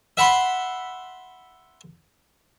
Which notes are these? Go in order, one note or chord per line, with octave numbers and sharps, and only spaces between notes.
E5 F#5 B5 C6